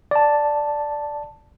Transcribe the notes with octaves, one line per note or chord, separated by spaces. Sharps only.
D5 A5